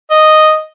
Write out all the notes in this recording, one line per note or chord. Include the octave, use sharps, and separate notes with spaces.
D#5